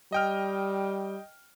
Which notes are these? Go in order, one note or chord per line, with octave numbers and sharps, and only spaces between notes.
G3 D#5 G5 F6